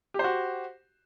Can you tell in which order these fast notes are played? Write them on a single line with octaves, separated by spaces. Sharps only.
G4 C5 F#4